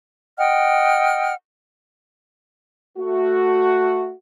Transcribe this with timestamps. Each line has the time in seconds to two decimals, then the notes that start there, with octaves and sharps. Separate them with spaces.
0.38 D#5 F#5 G5 F6
2.98 A3 F#4